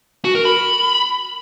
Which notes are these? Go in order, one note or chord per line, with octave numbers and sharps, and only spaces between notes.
F#4
A#4
B5